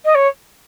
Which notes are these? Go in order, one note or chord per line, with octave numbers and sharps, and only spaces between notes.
D#5
C#5